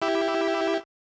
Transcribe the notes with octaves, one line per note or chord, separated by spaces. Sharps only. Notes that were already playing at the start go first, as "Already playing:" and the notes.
E4 G4 E5